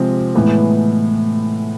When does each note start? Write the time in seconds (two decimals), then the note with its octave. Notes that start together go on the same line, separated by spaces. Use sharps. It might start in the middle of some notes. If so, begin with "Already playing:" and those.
Already playing: C3 F3 G#3 C4
0.35 A2 E3 G#3 B3